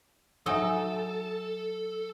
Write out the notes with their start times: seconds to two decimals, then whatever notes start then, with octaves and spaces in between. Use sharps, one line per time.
0.46 F#3 D#4 A4 D#5 E5 G#5 E6